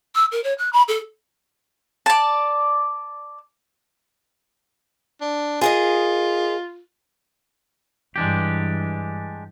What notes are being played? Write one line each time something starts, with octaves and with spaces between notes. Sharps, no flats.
E6
A#4
C#5
F#6
B5
A4
D5 A5
D4
F4 G#4 A#4 D#5
G2 E3 G#3 D4 G4